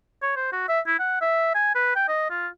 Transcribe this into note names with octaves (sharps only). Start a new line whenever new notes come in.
C#5
C5
F#4
E5
E4
F#5
E5
G#5
B4
G5
D#5
F4